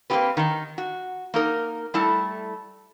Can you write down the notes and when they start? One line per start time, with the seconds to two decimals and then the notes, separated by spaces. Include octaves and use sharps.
0.10 A#3 C4 E4 F4 G4 B4
0.37 D#3 D#4
0.78 F#4
1.34 A#3 D#4 A#4
1.94 G3 A3 E4 A4